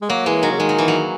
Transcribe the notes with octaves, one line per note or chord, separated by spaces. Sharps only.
G#3
F#3 A#3
E3 G#3
D#3 F#3
C#3
D#3 G#3
F#3
E3
F#3